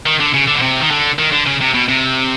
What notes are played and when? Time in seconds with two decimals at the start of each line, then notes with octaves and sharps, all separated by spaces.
0.06 D#3
0.20 D3
0.34 C#3
0.47 D3
0.55 B2
0.62 C3
0.80 D#3
0.91 D3
1.18 D#3
1.32 D3
1.46 C#3
1.61 C3
1.74 B2
1.88 C3